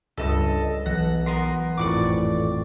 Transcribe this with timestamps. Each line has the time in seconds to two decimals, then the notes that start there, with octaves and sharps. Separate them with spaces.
0.18 C#2 G2 A4 D#5 E6
0.86 B1 E3 F#5 A#6
1.26 B3 A#4 C6
1.77 G#1 F2 A2 D5 C#6 D6